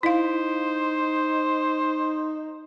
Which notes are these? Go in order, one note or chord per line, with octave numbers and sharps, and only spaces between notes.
D#4 E4 C5 F5